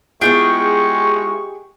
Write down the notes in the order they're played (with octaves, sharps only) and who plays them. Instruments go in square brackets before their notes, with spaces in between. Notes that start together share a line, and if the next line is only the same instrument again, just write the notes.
[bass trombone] G#3 [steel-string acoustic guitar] B3 E4 F4 [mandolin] G4 G#4 [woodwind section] G5 C#6